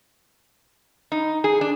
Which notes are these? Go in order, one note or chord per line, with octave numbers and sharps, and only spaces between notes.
D#4
G#4
D4